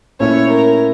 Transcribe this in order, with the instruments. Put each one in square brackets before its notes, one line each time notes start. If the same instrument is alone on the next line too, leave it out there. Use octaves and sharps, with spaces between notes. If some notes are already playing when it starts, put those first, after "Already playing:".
[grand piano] A#2 A3 C#4 E4 [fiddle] C#5
[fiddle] A#4